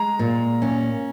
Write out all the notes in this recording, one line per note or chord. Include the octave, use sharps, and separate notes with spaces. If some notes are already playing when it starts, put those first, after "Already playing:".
Already playing: G#3 A#5
A#2
C#4